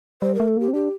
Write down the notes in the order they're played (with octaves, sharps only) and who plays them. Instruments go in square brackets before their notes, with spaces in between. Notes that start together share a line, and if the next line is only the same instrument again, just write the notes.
[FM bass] G3 [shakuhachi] C5
[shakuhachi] A#4
[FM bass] A3
[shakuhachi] A4
[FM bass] A#3 [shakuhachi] G4
[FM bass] C4
[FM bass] D4 [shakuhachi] G4